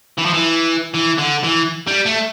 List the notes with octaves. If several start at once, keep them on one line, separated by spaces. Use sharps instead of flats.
E3
F3
E3
E3
D3
E3
G3
A3